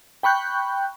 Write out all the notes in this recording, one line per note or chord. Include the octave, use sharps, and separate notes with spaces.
G5 B5 C#6 F#6 G6